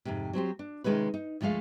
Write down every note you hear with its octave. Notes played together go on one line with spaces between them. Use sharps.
F2 G#2 C3
F#3 C4 G4 C5
D4
C3 D#3 G#3 C#4 B4
D#4
D2 F3 G#3 A3 F5